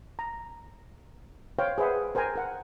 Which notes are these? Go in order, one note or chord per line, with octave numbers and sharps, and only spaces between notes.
A#5
C5 C#5 F5 G5
G#4 B4 C5 E5 F#5
A#4 C5 G5 G#5 A#5
A#4 F#5